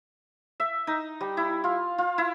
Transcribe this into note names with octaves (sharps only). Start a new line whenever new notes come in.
E5
D#4
G3
E4
F4
F4
E4